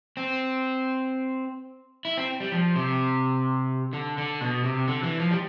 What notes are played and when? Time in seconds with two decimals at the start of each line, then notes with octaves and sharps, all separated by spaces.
0.17 C4
2.05 E4
2.17 C4
2.40 G3
2.52 F3
2.76 C3
3.93 D3
4.18 D3
4.41 B2
4.64 C3
4.88 D3
5.03 E3
5.20 F3
5.31 G3